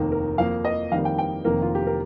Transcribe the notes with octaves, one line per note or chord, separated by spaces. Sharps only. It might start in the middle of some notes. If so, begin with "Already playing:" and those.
Already playing: F1 D#2 D#3 A#3
A#4
F2 F3 A#3 F5
D#5
F2 D#3 G3 A#3 F5
G5
G5
F1 F2 D#3 A#3 A#4
F4
G4
A#4